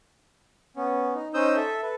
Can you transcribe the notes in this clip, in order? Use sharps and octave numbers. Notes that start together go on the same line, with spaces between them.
B3 C#4
D#4
C#4 D#4 C5 D#6 E6 G6
A4 E5
A4 B4